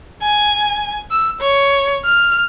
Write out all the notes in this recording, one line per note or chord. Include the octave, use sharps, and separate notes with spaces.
G#5
E6
C#5
F6